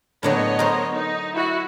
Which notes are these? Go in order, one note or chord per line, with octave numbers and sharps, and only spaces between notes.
A2 D3 F#3 B3 C#5 D#5
A#4 C5
D#4
E4 F#4